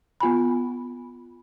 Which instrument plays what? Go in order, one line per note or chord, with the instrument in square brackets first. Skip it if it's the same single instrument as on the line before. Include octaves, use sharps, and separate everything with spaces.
[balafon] B3 F4 G#5 B5